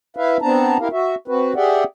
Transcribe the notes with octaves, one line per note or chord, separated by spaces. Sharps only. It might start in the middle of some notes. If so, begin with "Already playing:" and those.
E4 B4 E5 F5
B3 C4 D4 A5 A#5
E4 G4 A#4 F5
F#4 E5
C4 F#4 B4
G4 G#4 D5 E5 F#5 G5